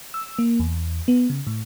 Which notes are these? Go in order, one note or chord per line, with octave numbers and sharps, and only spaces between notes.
E6
A#3
E2
B3
C#3
A2